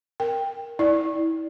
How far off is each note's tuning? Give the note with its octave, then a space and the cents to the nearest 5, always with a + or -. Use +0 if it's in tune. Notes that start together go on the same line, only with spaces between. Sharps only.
A#4 +0 G5 +10
E4 -30 D5 +0